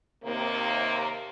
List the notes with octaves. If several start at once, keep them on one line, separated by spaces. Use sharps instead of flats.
D#2 C3 A#3